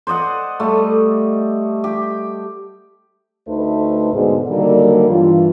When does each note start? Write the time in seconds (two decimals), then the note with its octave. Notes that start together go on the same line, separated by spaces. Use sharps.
0.07 C5 D5 D#5 F#5
0.60 G3 A3
1.84 G4
3.48 D2 A3 D#4 A4 B4 C5
4.13 G#2 B2 D3
4.49 D3 D#3 F#3 G3 A#3
5.09 G2 E3 F4